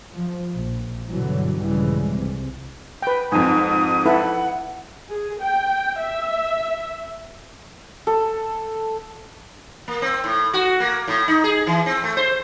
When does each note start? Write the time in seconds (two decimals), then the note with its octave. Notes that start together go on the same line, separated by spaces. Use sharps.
0.13 F3
0.55 A#1
1.10 G2 B2 D3 E3 F#3
1.60 A#1 G2 C#3 E3 G3 G#3
2.09 C2 C3
3.02 B4 G5
3.32 F2 G#2 G#5 D#6
4.06 E4 A4 B4 F#5
5.10 G#4
5.42 G5
5.99 E5
8.07 A4
9.88 A#3
10.02 C4
10.24 A2
10.54 F#4
10.80 A#3
11.08 A2
11.28 D#4
11.44 G#4
11.67 E3
11.86 C4
12.04 A3
12.17 C5